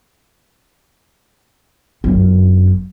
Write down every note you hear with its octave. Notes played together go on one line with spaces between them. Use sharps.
G1 F#2